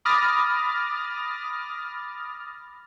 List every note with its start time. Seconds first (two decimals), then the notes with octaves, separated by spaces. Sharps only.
0.05 B5 D6 D#6 F6 A6 A#6